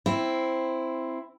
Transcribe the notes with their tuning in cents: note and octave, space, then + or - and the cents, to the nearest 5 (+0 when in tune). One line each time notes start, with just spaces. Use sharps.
C4 +0 E4 +5